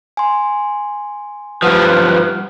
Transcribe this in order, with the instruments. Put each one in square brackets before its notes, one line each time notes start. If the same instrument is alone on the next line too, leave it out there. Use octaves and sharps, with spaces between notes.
[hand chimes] G#5 C6
[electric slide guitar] G2 F3 [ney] B4 [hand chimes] F#5 F6